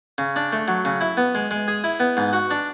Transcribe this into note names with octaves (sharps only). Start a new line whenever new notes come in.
C#3
D4
A3
F#3
C#3
E4
B3
G#3
G#3
G#4
E4
B3
G#2
F#4
D4